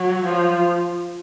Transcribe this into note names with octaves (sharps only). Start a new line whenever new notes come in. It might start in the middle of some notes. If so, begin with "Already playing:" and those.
Already playing: F#3
F3